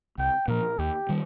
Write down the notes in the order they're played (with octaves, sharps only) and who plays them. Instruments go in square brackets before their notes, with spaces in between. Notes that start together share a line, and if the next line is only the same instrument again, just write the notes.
[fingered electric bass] C2 [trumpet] G5
[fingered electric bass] A#2 F3 [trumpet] A#4
[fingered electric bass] D#2 [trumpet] G4
[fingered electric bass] D#3 G3